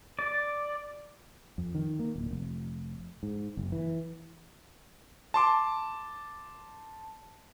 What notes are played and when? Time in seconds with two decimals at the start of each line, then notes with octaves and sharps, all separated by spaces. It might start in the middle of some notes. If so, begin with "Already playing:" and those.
0.19 D5
1.58 F2
1.75 D#3
1.99 A#3
2.15 D1
2.31 F1
3.23 G#2
3.57 F#1
3.72 E3
5.34 A5 C6 D6